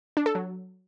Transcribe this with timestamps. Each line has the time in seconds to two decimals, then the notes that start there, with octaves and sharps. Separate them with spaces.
0.17 D4
0.26 A4
0.35 F#3